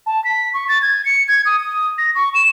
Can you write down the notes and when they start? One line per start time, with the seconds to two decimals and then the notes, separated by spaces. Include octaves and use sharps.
0.06 A5
0.24 B6
0.54 C#6
0.68 A6
0.82 G#6
1.05 C#7
1.28 G#6
1.45 D#6
1.60 D#6
1.98 A#6
2.15 C#6
2.34 E7